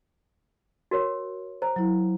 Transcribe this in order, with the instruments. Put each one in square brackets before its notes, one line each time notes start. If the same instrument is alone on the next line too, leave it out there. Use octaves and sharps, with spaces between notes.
[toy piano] F#4 A#4 C#5
[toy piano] C5 [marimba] A#5
[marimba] F#3 E4